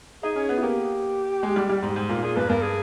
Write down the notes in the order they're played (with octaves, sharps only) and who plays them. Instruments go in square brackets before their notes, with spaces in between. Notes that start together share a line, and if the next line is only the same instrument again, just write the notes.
[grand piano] D#4 [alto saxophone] G#4
[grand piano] C#4
B3
[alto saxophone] E4
[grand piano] A#3 [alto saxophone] G4
[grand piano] G#3
G3
G3
G#2
G#2
A#2
[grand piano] A#2 [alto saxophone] G#4
[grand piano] G2 [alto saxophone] B4
[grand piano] G2 [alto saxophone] A#4
[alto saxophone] G#4